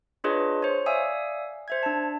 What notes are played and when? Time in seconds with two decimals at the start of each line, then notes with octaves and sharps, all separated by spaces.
0.24 D4 F4 G#4 B4 C#5 D#5
0.62 C5 C#5
0.86 D5 E5 F5 G#5 D#6 E6
1.68 C5 E5 G#6
1.83 D4 A5